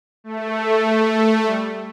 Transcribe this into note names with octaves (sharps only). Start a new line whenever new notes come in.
A3
G3